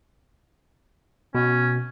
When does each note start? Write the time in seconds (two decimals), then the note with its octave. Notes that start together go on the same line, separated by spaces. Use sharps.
1.35 B2 C#4